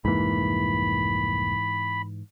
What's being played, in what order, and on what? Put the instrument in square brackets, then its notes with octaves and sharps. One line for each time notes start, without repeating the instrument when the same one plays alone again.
[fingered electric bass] C2 F2 A#3 [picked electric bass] G#2 E3 [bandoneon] B5